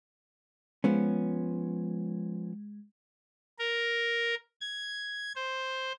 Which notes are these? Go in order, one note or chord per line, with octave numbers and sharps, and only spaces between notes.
F3 G#3 B3 C#4
A#4
G#6
C5